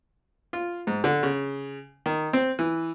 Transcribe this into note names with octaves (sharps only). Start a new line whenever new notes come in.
F4
G#2
D3
C#3
D#3
C4
E3